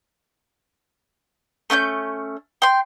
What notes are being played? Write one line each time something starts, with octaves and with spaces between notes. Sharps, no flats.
A3 C#4 G5 G6
G5 C6